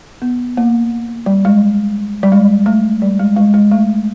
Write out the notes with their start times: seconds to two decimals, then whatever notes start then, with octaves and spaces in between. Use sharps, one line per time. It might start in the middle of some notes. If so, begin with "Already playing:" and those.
0.22 B3
0.57 A#3
1.26 G3
1.45 G#3
2.23 G3
2.32 G#3
2.66 A3
3.02 G3
3.20 G#3
3.37 G#3
3.54 G#3
3.71 A3